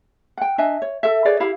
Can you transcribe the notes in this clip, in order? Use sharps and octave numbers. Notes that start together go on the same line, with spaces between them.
F#5 G5
D4 D#5 E5 G#5
C#5
A4 E5
G#4 B4 C#5 D5
E4 G4 F5 B5